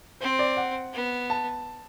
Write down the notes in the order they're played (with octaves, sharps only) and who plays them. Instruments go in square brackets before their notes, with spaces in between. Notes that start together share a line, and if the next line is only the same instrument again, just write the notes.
[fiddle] C4 [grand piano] C5
[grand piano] D5
F#5
[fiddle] B3
[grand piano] A5